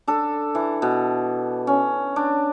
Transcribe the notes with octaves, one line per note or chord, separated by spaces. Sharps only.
D4 A4
E3
B2
C#4
D4